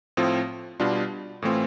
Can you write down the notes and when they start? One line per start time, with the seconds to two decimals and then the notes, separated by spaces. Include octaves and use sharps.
0.17 A2 F3 C4 F4
0.80 B2 G3 D4 F4
1.42 A2 E3 A3 C4 F4